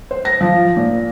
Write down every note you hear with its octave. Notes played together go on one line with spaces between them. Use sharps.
C5
A#6
F3
A#2